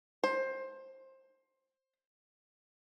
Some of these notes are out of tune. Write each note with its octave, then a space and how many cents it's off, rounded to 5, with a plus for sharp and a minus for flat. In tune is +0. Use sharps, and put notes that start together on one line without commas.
C5 +20